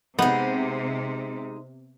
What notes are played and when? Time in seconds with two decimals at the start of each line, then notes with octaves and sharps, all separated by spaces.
0.19 C3 G#3 B3 D#4